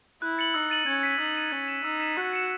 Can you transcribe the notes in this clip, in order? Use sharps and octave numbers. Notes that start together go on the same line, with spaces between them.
E4 F#6
A6 C#7 F#7
D#4 E6
A6 D#7 F#7
C#4 G#6
B6 D#7
D#4 E6
A6 D#7 F#7
C#4 G#6
C#7 E7
D#4 E6
B6 E7
F#4 F#6
C#7 E7